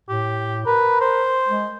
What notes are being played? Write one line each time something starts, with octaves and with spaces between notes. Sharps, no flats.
A2 G4
A#4 B4
C5
G#3